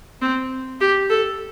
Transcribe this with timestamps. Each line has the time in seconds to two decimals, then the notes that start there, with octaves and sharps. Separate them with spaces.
0.21 C4
0.81 G4
1.10 A4